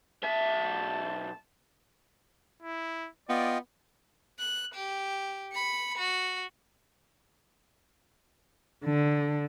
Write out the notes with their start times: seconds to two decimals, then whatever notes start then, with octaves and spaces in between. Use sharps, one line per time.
0.24 B1 E5 A5
2.62 E4
3.29 B3 F4 D5 D#5 G5
4.39 F#6
4.74 G4
5.53 B5 C#7
5.98 F#4
8.85 D3